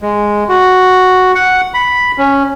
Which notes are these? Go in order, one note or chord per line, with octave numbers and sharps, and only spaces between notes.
G#3
F#4
F#5
B5
C#4